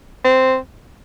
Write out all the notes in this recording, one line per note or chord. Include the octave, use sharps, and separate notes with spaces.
C4